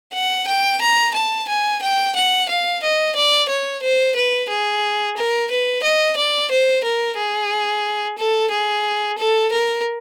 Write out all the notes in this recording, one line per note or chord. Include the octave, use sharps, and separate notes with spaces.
F#5
G5
A#5
A5
G#5
G5
F#5
F5
D#5
D5
C#5
C5
B4
G#4
A#4
B4
D#5
D5
C5
A#4
G#4
A4
G#4
A4
A#4